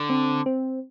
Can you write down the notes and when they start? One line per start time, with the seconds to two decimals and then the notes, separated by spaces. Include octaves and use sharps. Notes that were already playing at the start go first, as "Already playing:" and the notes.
Already playing: D3
0.10 C4
0.46 C4